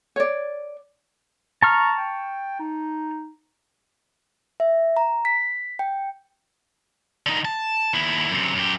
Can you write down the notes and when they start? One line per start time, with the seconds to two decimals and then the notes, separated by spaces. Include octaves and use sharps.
0.16 C#5 D5
1.62 A5 A#5 C#6 F6
1.98 G5
2.59 D#4
4.60 E5
4.97 A#5
5.25 B6
5.79 G5
7.26 D3 D#4
7.45 A5
7.94 D#2 E4
8.31 F#2 C3
8.55 F#2 G4